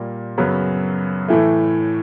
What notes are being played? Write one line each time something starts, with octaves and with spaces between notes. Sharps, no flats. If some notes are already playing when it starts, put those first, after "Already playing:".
Already playing: A#2 G3 A#3
F#2 C#3 F#3 B3
A2 E3 A3